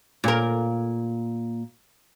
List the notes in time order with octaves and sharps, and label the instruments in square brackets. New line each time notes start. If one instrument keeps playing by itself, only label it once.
[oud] A#2 A#4